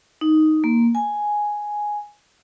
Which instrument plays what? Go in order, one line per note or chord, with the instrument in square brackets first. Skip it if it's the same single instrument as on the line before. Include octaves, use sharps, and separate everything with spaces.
[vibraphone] D#4
A#3
G#5